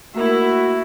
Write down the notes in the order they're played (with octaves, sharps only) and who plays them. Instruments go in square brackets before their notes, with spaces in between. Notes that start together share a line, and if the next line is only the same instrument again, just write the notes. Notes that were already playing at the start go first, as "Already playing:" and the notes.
[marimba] A3 A#3 A#4 [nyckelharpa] E4 E5 [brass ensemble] F#4